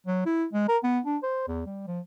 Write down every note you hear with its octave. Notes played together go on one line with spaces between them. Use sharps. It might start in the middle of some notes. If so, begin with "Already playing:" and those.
F#3
E4
G#3
A#4
B3
D4
C5
E2
G3
F3